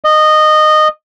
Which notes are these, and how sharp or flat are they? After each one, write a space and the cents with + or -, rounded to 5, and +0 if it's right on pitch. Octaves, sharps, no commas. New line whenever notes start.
D#5 -15